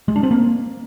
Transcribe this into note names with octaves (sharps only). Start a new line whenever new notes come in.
G#3
D4
C4
A#3